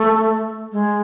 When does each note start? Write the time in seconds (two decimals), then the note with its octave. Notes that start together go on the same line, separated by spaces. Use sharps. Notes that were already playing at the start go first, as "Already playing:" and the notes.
Already playing: A3
0.72 G#3